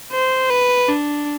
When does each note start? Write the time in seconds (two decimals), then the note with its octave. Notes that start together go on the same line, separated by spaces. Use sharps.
0.12 C5
0.50 B4
0.88 D4